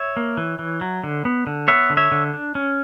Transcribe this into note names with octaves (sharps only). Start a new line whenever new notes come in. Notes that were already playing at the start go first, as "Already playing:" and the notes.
Already playing: C#5 E5
A#3
E3
E3
F#3
D3
B3
D3
B3 C#5 E5
D3
C#5 E5
D3
D4
C#4